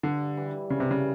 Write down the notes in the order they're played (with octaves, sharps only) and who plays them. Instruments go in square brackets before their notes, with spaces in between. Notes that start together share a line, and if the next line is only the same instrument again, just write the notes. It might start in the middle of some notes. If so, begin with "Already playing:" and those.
[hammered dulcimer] G2 [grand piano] D3
[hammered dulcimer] E3 G3
[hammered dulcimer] G2 [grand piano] C#3
[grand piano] C3
C#3